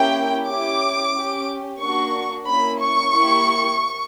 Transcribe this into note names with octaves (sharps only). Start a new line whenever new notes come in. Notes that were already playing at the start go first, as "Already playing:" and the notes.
Already playing: A#3 C#4 E4 G4 G5
C#4 E4 G4 D6
C#4 G4
A#3 D4 F#4 C#6
A#3 C#4 E4 B5
C#6
A#3 E4 G4